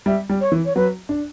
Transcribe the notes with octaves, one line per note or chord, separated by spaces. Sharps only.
G3 E5
G3
C#5
E3
C#5
F#3 B4
D4